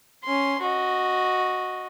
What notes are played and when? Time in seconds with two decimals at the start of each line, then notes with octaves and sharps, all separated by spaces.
0.24 C#4 C6
0.61 F#4 D#5